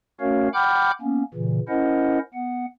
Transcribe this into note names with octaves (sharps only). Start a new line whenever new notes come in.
A3 C#4 F#4 A#4 C#5 F5
F#5 G5 B5 D6 F6 G6
A#3 B3 C#4
A#2 C#3 E3
C#4 E4 A#4 C5 D#5 F#5
B3 F#5